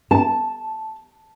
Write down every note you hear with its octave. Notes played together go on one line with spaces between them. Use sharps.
A5